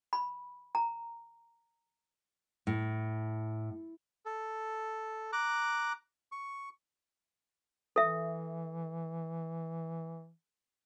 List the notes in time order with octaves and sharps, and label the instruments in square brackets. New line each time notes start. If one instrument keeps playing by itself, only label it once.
[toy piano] B5
A#5
[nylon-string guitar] A2
[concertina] A4
A#5 D6 F#6
C#6
[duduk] E3 [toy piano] A4 E5